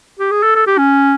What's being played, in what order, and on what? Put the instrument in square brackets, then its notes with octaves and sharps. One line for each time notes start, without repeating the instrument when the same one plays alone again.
[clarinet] G4
G#4
A4
A4
G4
C#4